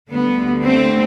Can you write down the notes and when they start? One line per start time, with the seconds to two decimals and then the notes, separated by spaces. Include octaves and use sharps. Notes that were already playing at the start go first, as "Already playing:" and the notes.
0.10 D2 D3 G3 B3
0.65 A3 C4